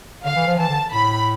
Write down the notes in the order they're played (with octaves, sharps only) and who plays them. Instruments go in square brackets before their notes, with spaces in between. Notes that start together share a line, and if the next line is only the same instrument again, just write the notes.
[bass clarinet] D3 [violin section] F5
[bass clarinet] E3
F3
[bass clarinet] E3 [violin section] A5
[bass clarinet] D3
[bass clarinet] A2 [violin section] B5